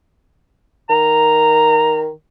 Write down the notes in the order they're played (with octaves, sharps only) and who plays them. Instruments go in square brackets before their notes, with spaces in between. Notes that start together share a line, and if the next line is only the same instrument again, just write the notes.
[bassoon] D#3 [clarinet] A#5